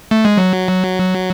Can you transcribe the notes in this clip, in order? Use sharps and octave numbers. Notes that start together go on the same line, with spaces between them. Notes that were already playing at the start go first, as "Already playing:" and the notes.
A3
G#3
F#3